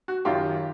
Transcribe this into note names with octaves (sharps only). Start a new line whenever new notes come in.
F#4
F#2 D#3 F4 G4